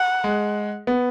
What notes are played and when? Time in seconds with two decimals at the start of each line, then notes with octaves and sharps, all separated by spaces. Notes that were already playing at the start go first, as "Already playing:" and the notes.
Already playing: F#5
0.24 G#3
0.87 B3